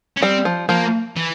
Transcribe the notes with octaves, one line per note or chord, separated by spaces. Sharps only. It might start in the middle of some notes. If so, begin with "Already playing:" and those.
C#4
G3 C4
F3
F3 A#3
E3